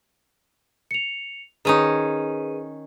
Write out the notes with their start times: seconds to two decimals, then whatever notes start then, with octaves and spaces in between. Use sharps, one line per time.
0.91 C#7 F7
1.65 D#3 C#4 D#4 G#4 B4 D#7